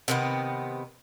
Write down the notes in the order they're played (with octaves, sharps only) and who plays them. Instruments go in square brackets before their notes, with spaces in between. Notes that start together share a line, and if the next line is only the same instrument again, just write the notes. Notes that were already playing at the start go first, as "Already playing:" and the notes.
[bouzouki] C3 D#3 B3